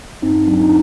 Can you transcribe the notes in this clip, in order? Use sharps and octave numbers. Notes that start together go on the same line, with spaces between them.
G2 C4 D#4
F#3 D4
D#4